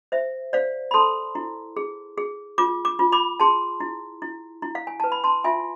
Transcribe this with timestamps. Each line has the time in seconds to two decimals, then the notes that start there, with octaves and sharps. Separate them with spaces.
0.12 C5 E5
0.53 C5 D5 F5
0.91 B5
0.94 A4 A5 C6
1.35 E4
1.77 G#4
2.18 G#4
2.58 F4 D6
2.85 D6
2.99 F4
3.12 B5 D6
3.40 G#4 A5 C6
3.80 E4
4.22 E4
4.62 E4
4.75 F5
4.87 G#5
5.00 B4 A5
5.12 B5
5.24 A5 C6
5.44 F4 E5 G#5